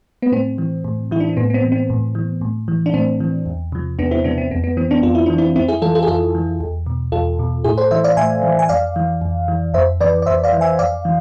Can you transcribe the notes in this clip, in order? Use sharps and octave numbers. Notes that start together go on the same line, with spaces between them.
B3
A2 C4
E3
A2
E3 E4
D4
C4
A2 B3
B3
C4
E3
C4
A2
E3
A2
E3
D4
A2 C4
E3
E2
C3 F3
E2 B3 D4
C4 E4
C3 F3 B3 D4
C4
F2 B3
B3
E3 C4
B3 D4
F2 F4
E4
E3 D4
C4 E4
F2 C4 E4
E4 G#4
E3 F4 A4
F4 A4
G#4
F2 F4 A4
E3
E2
B2
E2 F4 A4
B2
A2 E4 G#4
A4 C5
E3 C5 E5
D5 F5
A2 E5 G#5
E3
G#5
F2 D5 F5
E3
F2
E3
F2 C5 E5
E3 B4 D5
D5
F2 C5 E5
D5 F5
E3
E5 G#5
F2 D5 F5
E3